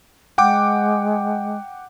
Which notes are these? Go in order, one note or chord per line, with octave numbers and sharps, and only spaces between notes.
G#3 F#5 G5 D6